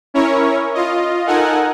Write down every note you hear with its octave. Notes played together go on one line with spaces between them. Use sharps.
C#4 E4 A#4 C#5
F4 D#5
D#4 A4 A#4 F#5 G#5